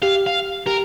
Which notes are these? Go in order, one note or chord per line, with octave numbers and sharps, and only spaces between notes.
G4 F5
F5
G4 A#4